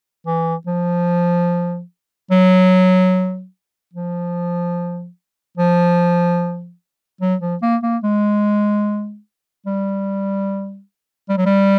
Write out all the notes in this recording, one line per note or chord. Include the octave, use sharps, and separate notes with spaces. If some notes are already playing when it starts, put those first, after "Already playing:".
E3
F3
F#3
F3
F3
F#3
F3
A#3
A#3
G#3
G3
G3
F#3
G3